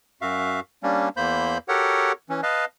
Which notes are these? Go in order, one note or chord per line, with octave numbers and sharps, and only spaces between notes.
F#2 F#4 E5 F5
G3 A#3 C#4 D4
E2 A#3 C5 B5 G6
F#4 G4 A4 A#4 C#5 F#5
E3 C#4
B4 D#5 F5 A5